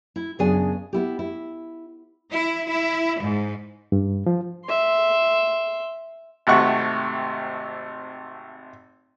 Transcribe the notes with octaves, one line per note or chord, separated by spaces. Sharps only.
E4
F#2 C#3 B3 D4 G#4 G#5
B3 E4 G4
E4
E4
E4
G#2
G2
F3
E5 C6
G#1 C3 A3 F#5 C#6